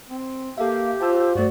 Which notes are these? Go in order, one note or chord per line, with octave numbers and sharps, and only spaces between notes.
C4
A#3 G4 A4 E5 F5
F4 C5 G5 A5 E6
G2 A3 F#4 D5